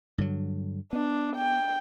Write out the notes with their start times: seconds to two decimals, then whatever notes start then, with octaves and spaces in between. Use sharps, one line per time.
0.18 G2 D3 F#3
0.93 B3 D4
1.36 G5